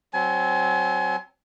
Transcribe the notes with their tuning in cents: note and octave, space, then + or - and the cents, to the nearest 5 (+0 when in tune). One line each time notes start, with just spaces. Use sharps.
F#3 +10 C4 +0 G#5 +35